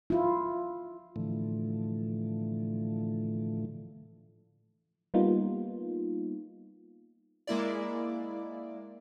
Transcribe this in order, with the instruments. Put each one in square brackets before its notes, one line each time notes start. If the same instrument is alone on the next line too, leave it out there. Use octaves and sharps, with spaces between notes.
[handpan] E4 F4
[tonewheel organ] A2 D3 E3 F3 A3
[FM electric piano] G3 A#3 B3 D#4 F4
[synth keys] G#3 A#3 E4 D5